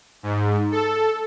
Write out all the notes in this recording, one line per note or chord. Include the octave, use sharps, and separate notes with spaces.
G#2
A4